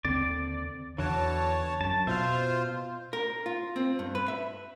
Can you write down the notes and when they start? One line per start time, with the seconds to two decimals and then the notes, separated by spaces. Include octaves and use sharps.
0.05 D#2 D3 C4 D5
0.98 E2 D3 E3 F#4 C#5 A5
1.81 F#2 A5
2.07 B2 F4 C5 E5 F5
3.13 A#4
3.46 F4
3.76 C4
3.99 G2
4.15 B4
4.28 E5